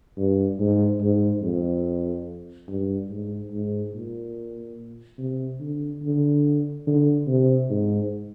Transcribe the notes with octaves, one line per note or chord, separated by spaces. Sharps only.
G2
G#2
G#2
F2
G2
G#2
G#2
A#2
C3
D3
D3
D3
C3
G#2